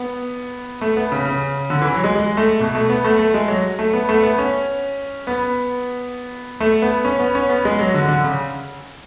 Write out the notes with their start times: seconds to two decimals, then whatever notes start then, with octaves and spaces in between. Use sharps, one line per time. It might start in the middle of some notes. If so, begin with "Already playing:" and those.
Already playing: B3
0.81 A3
0.97 B3
1.12 C#3
1.25 C#3
1.70 D3
1.82 E3
1.93 F#3
2.04 G#3
2.15 G#3
2.37 A3
2.60 B2
2.75 A3
2.89 B3
3.04 A3
3.19 A3
3.34 G#3
3.48 F#3
3.79 A3
3.93 B3
4.09 A3
4.23 B3
4.38 C#4
5.27 B3
6.60 A3
6.82 B3
7.05 C#4
7.20 B3
7.35 C#4
7.49 B3
7.65 G#3
7.79 F#3
7.94 D3
8.08 D3
8.24 C#3